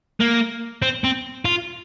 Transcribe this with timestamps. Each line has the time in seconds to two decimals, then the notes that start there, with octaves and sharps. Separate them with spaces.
0.20 A#3
0.82 C4
1.04 C4
1.45 F4